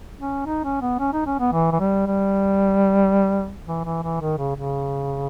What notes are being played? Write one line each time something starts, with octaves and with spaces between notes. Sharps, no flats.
C#4
D#4
C#4
B3
C#4
D#4
C#4
B3
E3
E3
G3
G3
E3
E3
E3
D#3
C#3
C#3